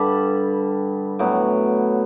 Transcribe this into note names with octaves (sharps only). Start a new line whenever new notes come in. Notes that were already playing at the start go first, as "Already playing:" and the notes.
Already playing: G2 D3 G3 A5 B5
A2 F#3 B3 G5